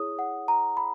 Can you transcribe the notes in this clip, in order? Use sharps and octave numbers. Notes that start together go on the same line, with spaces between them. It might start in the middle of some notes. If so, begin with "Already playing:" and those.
Already playing: E4 G#4 C#5 D#6
F#5
A#5
B5